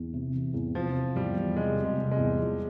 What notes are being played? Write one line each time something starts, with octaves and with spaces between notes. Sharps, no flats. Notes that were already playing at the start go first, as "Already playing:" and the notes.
Already playing: E2
C3
E3
E2
C3 F3
E3
E2 G3
E2
C3 G#3
C3
G#3
C3
G#3
E2
F3